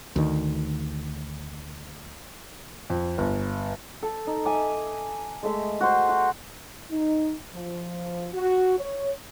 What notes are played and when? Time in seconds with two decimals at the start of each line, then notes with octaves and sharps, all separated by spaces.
0.16 D2 D#3
2.90 F2
3.18 G1
4.03 A4
4.27 D#4
4.45 E5 G#5 D6
5.43 G#3 A3 E5
5.81 F#4 C5
6.09 F#4
6.91 D#4
7.54 F3
8.33 F#4
8.78 C#5